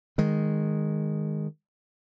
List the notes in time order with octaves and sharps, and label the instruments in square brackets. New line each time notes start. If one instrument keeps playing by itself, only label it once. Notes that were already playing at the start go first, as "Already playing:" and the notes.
[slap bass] D#3 G#3